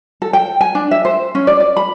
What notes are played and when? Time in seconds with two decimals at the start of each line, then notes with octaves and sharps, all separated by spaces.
0.22 A4
0.33 G5
0.61 G#5
0.75 D4
0.91 E5
1.05 C5
1.35 C#4
1.47 D5
1.60 D5
1.77 B5